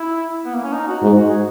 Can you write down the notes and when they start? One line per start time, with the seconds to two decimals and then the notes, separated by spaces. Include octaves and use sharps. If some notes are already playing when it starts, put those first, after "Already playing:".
Already playing: E4
0.45 B3
0.55 A#3
0.64 C#4
0.73 D#4
0.88 F#4
1.03 G#2
1.16 F#4
1.30 G#4